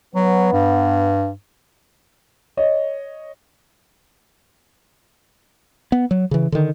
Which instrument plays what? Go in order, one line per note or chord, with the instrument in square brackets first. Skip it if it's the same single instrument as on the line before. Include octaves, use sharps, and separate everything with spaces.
[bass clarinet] F#3 [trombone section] B3
[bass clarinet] G2
[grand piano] C#5 D#5
[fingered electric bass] B3
F#3
C#3 E3
D3 D#3